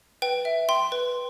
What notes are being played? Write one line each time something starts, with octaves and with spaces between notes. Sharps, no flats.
B4 G5
E5
G5 C6
B4